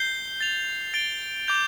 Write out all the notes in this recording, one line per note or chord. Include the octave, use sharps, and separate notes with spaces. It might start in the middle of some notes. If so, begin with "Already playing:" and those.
Already playing: G6 C7 G7
A6 F7
A6 D7 G7
D6 G6 F7